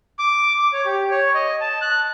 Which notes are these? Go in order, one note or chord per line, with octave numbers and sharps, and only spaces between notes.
D6
D6
C#5
G4
C#5
D#5
A5
F#6